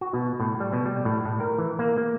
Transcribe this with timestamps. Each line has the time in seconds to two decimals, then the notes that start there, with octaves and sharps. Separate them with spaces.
0.01 F#4
0.14 B2
0.40 A2
0.60 G3
0.73 B2
0.86 G3
1.05 A2
1.25 A2
1.40 A#4
1.58 E3
1.79 A#3
1.98 A#3